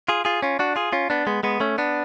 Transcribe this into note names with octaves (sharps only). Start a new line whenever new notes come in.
F4 G#4
F4 G#4
C#4 F4
D4 F#4
F4 G#4
C#4 F4
B3 D4
G#3 B3
G#3 B3
A3 C#4
B3 D4